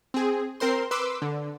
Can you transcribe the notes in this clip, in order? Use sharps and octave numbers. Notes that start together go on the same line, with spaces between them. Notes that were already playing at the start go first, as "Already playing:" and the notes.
C4 G#4
C4 A#4 C5 C6
B4 C6 D6 E6
D3